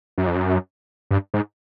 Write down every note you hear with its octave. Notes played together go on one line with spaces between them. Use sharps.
F#2
F2
F#2
G2
G#2